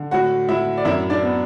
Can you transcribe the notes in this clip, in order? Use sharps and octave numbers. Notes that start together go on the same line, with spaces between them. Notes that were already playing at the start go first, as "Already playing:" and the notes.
Already playing: D3
A2 F#4 F#5
A2 E4 E5
D5
F#2 E4 E5
D4 D5
B3